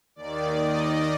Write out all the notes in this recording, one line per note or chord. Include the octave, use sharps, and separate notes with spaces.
D#2 D#3 D5
D#5